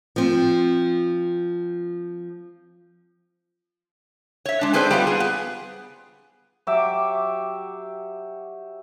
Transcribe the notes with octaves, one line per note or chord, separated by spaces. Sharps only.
F3 C4
C#5 E5
G#3 D4
C4 G#4 A4 B4 C5 D5
G3 B3 F4
G#4
B3
F#3 G4 E5 D6